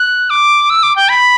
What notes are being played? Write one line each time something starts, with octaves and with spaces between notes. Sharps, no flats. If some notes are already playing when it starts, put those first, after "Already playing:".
Already playing: F#6
D6
E6
D6
G5
B5